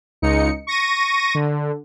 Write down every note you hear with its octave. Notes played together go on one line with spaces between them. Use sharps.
C#2 D#4 C#7
C#6 A#6 D#7
D3